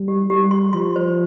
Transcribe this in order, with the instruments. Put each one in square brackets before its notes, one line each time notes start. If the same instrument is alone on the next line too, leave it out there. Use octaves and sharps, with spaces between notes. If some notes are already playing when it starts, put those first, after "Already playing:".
Already playing: [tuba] G3
[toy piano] G4
[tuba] G3 [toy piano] G4
[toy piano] C6
[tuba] F3 [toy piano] C6
[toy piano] C5